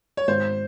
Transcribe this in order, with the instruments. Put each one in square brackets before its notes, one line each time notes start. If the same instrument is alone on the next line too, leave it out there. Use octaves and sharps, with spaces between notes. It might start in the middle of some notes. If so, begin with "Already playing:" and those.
[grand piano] C#5
[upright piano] G#1 [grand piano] C5